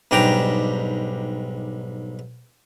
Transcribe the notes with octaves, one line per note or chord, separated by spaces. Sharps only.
B1 G#2 G3 D4 G5 A#5